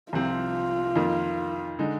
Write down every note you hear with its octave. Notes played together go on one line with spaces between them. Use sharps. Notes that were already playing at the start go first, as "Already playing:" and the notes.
C2 C3 F3 C4 F4
F2 D#3 A#3
D3 G#3 D#4